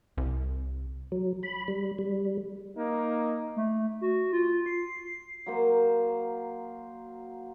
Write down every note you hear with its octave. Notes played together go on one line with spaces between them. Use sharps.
C2
F#3
B5
G3
G3
A#3 D#4
A3
F#4
F4
C7
F#3 A#3 C5